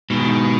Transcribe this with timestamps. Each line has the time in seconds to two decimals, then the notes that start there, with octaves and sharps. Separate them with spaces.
0.10 G#2 B2 D#3